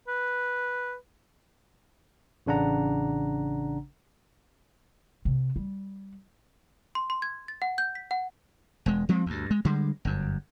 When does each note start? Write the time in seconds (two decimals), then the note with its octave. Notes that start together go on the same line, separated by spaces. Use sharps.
0.08 B4
2.46 A1 C#3 D4 F#5 A#5
5.25 C3
5.56 G3
6.95 C6
7.10 C6
7.22 G#6
7.48 A6
7.62 F#5
7.78 G6
7.95 B6
8.11 F#5
8.86 E1 G#3
9.09 F3 G#3 C4
9.26 D2 G2
9.51 G#3
9.65 D3 G3 G#3
10.05 G1 F#2